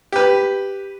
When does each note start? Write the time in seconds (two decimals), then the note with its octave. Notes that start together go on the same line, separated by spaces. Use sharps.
0.12 G4 B4